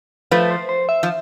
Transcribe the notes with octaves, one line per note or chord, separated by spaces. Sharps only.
F3 A3 B4
C5
C5
E5
F3